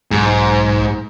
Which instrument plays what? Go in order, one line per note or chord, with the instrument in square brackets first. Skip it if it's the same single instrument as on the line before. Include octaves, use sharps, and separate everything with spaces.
[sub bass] B1 [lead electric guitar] G#2